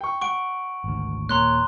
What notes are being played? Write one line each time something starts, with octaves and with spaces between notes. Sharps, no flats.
G5 C#6
F#5 C#6 D7
G#1 D2
D#1 C#2 A#3 C#5 A#5 C6 F#6